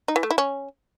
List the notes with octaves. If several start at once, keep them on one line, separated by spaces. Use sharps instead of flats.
D#4
E3
A3
E4
C#4